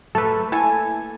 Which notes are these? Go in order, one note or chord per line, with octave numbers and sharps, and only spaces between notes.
A3 A#3 A4 B4
E4 A4 G#5